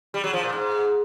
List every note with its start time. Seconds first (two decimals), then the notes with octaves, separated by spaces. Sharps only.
0.14 G3
0.24 F#3
0.33 F3
0.43 A#2
0.53 G#2